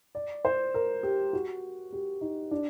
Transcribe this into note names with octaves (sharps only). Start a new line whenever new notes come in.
D5
C5
A#4
G4
F#4
G4
D#4
D4